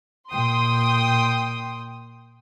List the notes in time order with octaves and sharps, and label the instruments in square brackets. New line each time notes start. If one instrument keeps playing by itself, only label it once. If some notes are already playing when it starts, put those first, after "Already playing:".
[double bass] A#2 [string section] G5 C6 D#6